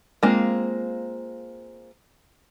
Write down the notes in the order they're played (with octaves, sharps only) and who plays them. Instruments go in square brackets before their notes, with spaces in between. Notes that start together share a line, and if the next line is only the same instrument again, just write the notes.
[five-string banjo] G#3 A#3 C4 F4